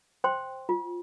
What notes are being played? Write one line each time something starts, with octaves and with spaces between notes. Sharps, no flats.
C5 G5 C6
F4